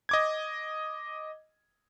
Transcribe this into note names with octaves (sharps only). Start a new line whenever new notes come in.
D#5 D6 G#6